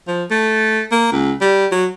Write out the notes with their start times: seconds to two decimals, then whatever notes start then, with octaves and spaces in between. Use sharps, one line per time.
0.08 F3
0.31 A3
0.92 A#3
1.12 C#2
1.41 G3
1.72 F#3